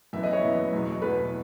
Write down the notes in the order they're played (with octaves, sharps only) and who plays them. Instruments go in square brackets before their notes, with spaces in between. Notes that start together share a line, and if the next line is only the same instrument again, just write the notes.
[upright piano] F#2 E3 B3 [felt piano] E5
[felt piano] D#5
C#5
[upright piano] F#2 E3 B3
E2 B2 F#3
[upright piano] E2 B2 F#3 [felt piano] B4